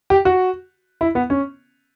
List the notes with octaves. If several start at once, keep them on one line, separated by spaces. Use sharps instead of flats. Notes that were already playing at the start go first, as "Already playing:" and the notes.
G4
F#4
E4
B3
C#4